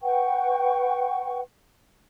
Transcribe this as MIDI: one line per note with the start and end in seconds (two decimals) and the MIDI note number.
0.01 1.40 71
0.01 1.40 78
0.01 1.40 79
0.01 1.40 85